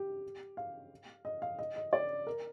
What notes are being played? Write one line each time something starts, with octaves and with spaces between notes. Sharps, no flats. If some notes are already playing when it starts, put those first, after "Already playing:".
Already playing: G4
F5
D#5
F5
D#5
D#5
D5
A#4